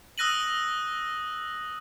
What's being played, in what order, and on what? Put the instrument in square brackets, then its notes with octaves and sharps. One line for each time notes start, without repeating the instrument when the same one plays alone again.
[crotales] D#6 E6 F#6 A#6 D#7 F#7